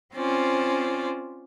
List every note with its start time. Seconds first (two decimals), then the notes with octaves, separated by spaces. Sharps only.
0.14 C4 C#4 F4 C5 D5